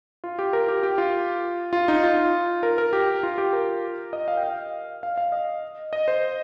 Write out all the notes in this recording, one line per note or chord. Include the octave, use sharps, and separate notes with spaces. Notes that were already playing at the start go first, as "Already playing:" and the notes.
F4
G4
A#4
G4
G4
F4
F4
D#4
F4
A#4
A#4
G4
F4
G4
A#4
D#5
F5
G5
F5
F5
F5
D#5
D#5
C5